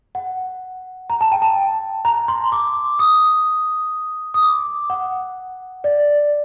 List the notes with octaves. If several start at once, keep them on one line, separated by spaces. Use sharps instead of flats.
F#5
A#5
A5
G5
A5
A#5
C6
D6
D#6
D#6
D6
F#5
D5